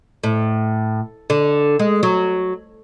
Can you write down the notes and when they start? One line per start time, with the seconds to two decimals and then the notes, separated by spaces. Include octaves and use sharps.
0.24 A2
1.30 D3
1.79 G#3
2.03 F#3